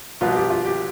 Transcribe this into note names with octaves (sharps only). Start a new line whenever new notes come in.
C2 B2 B3 F4
G4
F4
G4